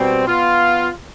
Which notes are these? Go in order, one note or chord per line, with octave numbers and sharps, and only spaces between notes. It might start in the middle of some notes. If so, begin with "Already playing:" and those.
Already playing: B2 G3 C4
B3 F4